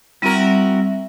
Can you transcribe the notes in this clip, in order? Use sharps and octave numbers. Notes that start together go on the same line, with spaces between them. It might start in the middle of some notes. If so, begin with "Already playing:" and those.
G3 C4 E4 F#4 A#4